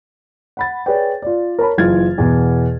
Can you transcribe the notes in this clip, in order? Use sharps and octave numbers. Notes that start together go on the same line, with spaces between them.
F#5 B5 A6
G#4 B4 C#5 D5 G5
F4 D5
A#4 C#5 A5 B5
F#1 E3 F4 F6 G#6 A6
E2 B2